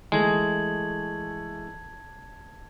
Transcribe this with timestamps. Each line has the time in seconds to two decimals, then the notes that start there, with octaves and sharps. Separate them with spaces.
0.12 E3 G#3 A3 A5 G#6 F#7